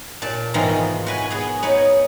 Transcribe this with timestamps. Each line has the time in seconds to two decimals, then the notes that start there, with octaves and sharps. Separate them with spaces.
0.22 A#2 D5 A5
0.54 G#2 B2 D#3 E3 A#3 F4
1.06 F#4 B4 G#5
1.31 B3 G#4
1.63 B3 D#4 C#5